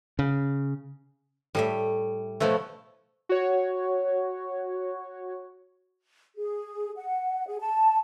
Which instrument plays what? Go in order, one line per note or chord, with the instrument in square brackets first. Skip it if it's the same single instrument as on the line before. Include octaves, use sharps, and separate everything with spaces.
[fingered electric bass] C#3
[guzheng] A2 A3 E5 [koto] G3
[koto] B2 F3 A3 [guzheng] E4 B4 C#5
[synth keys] F#4 C#5
[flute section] G#4
F#5
G#4
A5